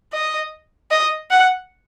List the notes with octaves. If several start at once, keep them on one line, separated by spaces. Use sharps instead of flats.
D#5
D#5
F#5